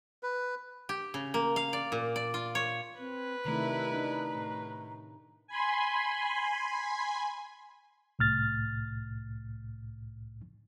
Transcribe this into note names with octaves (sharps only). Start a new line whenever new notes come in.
B4
G4
C#3
A#3
F5
D5
A#2
D5
F4
C#5
C4 B4
C3 D#3 A3 E4 D5 A#5
D4 D#4
A2
G#5 B5 C6
C2 A2 F6 A6